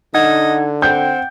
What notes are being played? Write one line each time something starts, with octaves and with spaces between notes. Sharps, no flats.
D3 D#4 D#5 F#5 G#6
C4 F#5 G5 G6